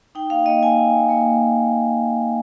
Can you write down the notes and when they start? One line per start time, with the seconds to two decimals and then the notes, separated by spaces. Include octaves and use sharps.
0.15 D#4 G5
0.30 A#3 F5
0.46 A#3 D#5
0.62 D#4 G#5
0.78 D#4
0.94 A#3
1.09 A#3